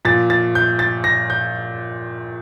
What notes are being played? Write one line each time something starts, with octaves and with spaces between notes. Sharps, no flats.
A#2 F3 A6
A6
G6
A6
A#6
G6